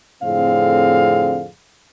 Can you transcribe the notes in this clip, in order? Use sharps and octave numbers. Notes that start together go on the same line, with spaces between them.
F2 A2 D3 C4 G#4 F5